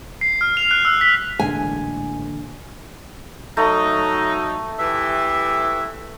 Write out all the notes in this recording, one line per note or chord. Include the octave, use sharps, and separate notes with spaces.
C7
F6
F7
F#6
E6
B6
A1 A#2 D3 E3 G#3 G#5
F#3 A3 D#4 A#5
E3 G4 E5